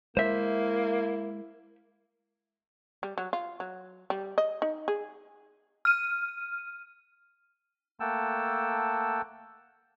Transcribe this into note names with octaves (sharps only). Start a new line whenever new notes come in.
G#3 A#3 E4 C5 E5
G3
F#3
F4
F#3
G3
D#5
D#4
G#4
F6 D#7
A3 A#3 F#5 G5 A5 E6